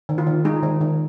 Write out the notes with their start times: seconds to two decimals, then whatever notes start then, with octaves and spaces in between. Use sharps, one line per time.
0.09 D#3
0.18 F4
0.27 D#3
0.45 G#3 D#4 G#4
0.63 D#3
0.81 D#3